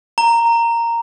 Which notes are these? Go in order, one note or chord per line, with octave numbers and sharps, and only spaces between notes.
A#5